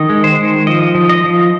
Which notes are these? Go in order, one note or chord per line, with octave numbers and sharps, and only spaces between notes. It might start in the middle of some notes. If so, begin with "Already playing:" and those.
Already playing: D#3 D#5
G#3
C5
D#3
F3 D#5
F3
D#5
F3